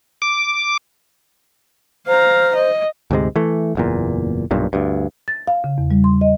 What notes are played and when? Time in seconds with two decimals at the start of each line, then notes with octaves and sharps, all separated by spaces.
0.22 D6
2.07 C5 F5 A#5
2.55 D#5
3.11 D2 G#2 C3 G#3
3.36 E3 A3
3.75 F#1 E2 A#2
4.51 B1 G2 A#2
4.73 D2 G2
5.28 A6
5.48 F5
5.64 C#3
5.78 E2
5.91 G3
6.04 C6
6.21 D#5